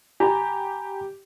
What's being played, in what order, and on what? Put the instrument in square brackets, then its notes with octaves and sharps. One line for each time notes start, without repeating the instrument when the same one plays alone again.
[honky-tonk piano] G4 [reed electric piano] G#5 A#5 B5